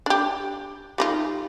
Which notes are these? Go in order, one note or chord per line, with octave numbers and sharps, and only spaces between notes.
D4 G4
G3 D#4 F4